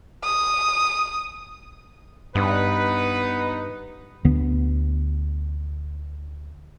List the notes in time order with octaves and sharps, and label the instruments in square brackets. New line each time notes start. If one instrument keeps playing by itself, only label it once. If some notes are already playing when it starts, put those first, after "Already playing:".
[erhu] D#6
[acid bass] G2 [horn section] B3 D#4 B4
[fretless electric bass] D2 D3 B3